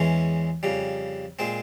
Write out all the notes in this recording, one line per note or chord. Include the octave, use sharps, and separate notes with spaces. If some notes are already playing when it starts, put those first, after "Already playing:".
Already playing: E2 E3 G#3 C#4
F2 C#3 G3
A#2 G#3 C4